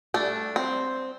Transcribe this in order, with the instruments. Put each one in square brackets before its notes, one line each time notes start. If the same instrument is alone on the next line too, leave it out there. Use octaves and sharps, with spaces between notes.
[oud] G3 [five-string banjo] A3 D4
[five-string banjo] C4